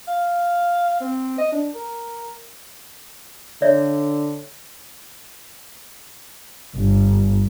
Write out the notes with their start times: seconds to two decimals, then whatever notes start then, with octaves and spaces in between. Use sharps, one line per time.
0.08 F5
1.01 C4
1.38 D#5
1.52 D4
1.75 A#4
3.62 D3 C#5 D5 E5
6.74 G1